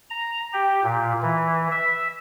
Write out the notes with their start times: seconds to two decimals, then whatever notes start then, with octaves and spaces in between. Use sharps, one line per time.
0.10 A#5
0.53 G4
0.84 A#2
1.22 E3
1.71 E5